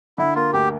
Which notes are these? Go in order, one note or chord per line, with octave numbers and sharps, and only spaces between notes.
D3 E4
A#3 F4
D2 G4